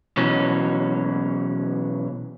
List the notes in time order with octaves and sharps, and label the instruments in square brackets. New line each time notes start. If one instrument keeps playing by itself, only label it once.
[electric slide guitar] B2 E3 F#3 C#4